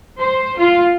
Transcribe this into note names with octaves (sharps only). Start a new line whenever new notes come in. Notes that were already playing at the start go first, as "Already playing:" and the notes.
C5
F4